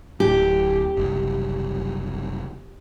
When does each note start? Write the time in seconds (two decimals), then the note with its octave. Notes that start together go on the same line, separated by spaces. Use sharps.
0.20 D1 A2 G4
0.96 F#1 C2